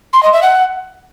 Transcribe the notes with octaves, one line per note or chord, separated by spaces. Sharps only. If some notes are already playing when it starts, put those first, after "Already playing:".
C6
D#5
E5
F#5